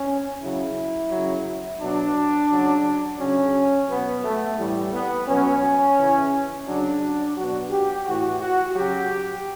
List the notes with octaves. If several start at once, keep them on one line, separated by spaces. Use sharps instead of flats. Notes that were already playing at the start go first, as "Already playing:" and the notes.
Already playing: C#4
C#3 F#3 E4
C#3 F#3
B2 F#3 D4
C#3 F#3
C#3 F#3 C#4
B2 F#3 B3
A3
A2 E3 G3
B3
B2 F#3 C#4
C#3 E3
C#3 F#3 D4
B2 F#3 F#4
G4
A2 E3 F#4
F#4
C#3 F#3 G4